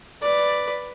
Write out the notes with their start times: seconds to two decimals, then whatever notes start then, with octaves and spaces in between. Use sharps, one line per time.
0.22 B4 D5